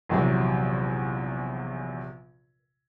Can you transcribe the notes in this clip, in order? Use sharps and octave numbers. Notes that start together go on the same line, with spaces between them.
A#1 E2 C3 F#3